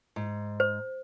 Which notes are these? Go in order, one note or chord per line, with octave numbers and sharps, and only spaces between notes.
G#2
C5